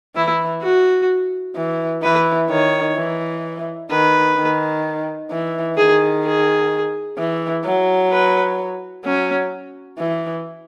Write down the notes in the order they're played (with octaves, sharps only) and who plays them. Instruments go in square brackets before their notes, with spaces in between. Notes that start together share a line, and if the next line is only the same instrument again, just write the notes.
[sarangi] E3 [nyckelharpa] E4
[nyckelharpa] F#4
[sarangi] E3
[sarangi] E3 [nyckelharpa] B4
[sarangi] D#3 [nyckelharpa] C#5
[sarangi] E3
[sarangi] D#3 [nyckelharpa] B4
[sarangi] D#3
E3
[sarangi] D#3 [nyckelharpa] G#4
[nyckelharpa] G#4
[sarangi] E3
F#3
[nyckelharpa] B4
[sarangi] F#3 [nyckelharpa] C#4
[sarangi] E3